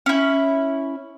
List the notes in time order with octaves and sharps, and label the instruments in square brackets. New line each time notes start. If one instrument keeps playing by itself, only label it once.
[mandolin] C#4 E4